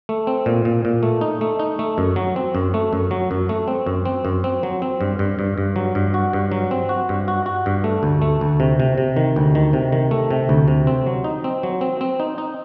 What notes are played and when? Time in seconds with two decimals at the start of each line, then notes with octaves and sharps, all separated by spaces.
0.09 A3
0.27 C4
0.46 A#2
0.65 A#2
0.85 A#2
1.03 A3
1.21 D#4
1.41 A3
1.60 D#4
1.79 A3
1.98 F#2
2.16 F#3
2.36 C4
2.55 F#2
2.74 A3
2.93 F#2
3.11 F#3
3.31 F#2
3.49 A3
3.68 C4
3.86 F#2
4.06 C4
4.25 F#2
4.44 C4
4.63 F#3
4.82 C4
5.01 G2
5.19 G2
5.39 G2
5.58 G2
5.76 F#3
5.95 G2
6.14 F#4
6.33 G2
6.52 F#3
6.71 C4
6.89 F#4
7.09 G2
7.28 F#4
7.46 F#4
7.66 G2
7.84 A3
8.03 D2
8.22 A3
8.41 D2
8.60 C3
8.80 C3
8.98 C3
9.16 D#3
9.36 D2
9.55 D#3
9.73 C3
9.92 D#3
10.11 A3
10.31 C3
10.49 D2
10.68 C3
10.87 C4
11.06 F#3
11.24 D#4
11.44 C4
11.63 F#3
11.81 C4
12.01 C4
12.20 D#4
12.38 D#4